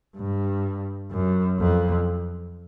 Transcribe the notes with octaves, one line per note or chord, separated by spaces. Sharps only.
G2
F#2
F2